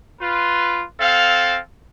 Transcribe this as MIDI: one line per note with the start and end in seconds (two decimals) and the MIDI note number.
0.20 0.84 65
0.20 0.84 71
1.00 1.59 60
1.00 1.59 69
1.00 1.59 77